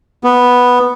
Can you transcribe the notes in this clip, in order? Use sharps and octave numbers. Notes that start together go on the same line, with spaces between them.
B3